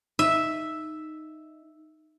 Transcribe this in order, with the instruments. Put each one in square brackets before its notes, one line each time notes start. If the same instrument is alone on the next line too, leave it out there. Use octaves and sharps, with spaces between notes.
[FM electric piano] D#4 [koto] E5